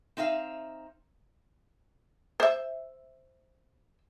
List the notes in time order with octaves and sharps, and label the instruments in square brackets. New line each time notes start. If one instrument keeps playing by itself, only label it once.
[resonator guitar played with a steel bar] C4 D#4 E5 F5
[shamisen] C5 E5